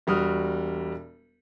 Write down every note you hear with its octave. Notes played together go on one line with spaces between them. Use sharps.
E1 G3 F#4 D#6 F6